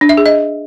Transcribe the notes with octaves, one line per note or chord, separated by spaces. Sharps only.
D4
E5
G#4
D#5